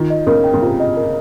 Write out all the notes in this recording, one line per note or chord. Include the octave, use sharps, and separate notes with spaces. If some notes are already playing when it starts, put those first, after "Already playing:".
Already playing: D#3 F4
D#5
C#3 A#4
G5
C#3
C3 F4
D#5
A#4